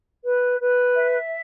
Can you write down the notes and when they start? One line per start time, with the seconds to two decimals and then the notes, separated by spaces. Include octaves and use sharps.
0.24 B4
0.59 B4
0.95 E5